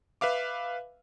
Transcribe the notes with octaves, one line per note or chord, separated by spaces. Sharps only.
B4 E5 F5 D6